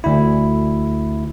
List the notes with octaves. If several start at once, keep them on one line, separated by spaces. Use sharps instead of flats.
D2 E4